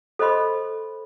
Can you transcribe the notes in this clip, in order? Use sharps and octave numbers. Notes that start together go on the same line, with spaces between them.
A4 C5 D#5 B5 C6